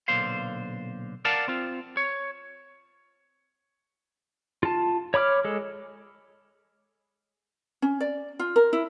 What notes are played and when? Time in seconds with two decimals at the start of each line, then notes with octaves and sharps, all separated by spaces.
0.08 B1 A#2 D3 C5 F5
1.25 A#4 D5 F5 F#5 A5
1.48 C4 F4
1.97 C#5
4.63 F4 A5
5.14 C#5 B5 D6 F6
5.45 G#3 A4
7.82 C#4
8.01 D5
8.39 F4
8.56 A#4
8.73 E4